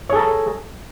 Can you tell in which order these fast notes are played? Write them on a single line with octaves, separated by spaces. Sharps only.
C#5 G#4 A4 A#5